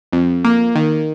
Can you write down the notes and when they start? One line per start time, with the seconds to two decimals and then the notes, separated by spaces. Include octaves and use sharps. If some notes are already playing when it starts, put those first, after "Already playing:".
0.13 F2
0.44 A#3
0.75 D#3